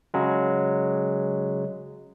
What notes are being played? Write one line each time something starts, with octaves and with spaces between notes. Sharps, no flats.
C#3 F#3 G#3